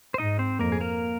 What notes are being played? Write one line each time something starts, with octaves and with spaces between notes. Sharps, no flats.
C5
G#2 D#4 D#5
C4 C5
F2 A#3 A#4
G#4
A#3 A#4